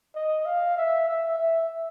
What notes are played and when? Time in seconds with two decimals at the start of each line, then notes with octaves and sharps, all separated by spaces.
0.15 D#5
0.46 F5
0.78 E5
1.08 E5
1.38 E5